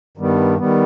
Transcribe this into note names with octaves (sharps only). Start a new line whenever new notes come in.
G2 D#3 G3 B3
D#3 G3 B3